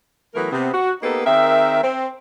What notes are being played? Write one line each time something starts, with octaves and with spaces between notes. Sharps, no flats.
E3 F#3 A3 B3 A#4
C3 B3
F#4
A#3 B3 D#4 G4 A4 B4
D#3 C4 G#4 A#4 E5
C4